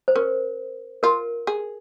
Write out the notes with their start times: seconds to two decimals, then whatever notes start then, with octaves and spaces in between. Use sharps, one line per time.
0.08 C5
0.16 C#4 A#4
1.03 F4 A#4
1.47 G#4